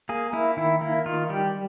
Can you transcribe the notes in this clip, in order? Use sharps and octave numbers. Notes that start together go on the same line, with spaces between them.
A#3 G#4
A#3 E4
D#3 E4
A#3 E4
D#3 F4
G3 G4